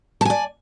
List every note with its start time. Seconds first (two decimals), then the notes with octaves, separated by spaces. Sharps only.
0.21 A5
0.25 G#5
0.30 D5